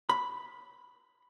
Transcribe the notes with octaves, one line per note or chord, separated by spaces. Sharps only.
B5